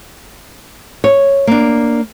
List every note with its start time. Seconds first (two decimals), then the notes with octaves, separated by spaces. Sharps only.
1.04 C#5
1.47 A#3 D4